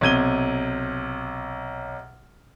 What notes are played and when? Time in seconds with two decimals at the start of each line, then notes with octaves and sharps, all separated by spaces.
0.01 B1 C3 G#6 D#7 G7